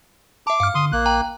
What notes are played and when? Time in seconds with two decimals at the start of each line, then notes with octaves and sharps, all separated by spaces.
0.47 E5 A5 D6
0.60 G2 F5 F6
0.75 D3 C6 D#6
0.92 A#1 A#3 F#6
1.06 G5 A#5